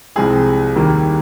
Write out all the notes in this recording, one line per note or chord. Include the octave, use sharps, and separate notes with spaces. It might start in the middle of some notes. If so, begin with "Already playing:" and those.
C2 C3 F3 G#3 G#4
D#2 D#3 G3 A#3